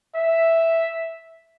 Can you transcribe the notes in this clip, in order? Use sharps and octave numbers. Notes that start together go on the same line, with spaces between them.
E5